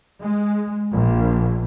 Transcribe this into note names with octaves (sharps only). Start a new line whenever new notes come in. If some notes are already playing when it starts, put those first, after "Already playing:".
G#3
A#1